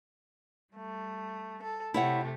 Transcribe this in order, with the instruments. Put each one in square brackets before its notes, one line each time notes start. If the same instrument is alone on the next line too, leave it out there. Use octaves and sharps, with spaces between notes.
[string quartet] G3 A3
A4
[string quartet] C3 A3 G4 [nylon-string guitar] E4 C#5 F#5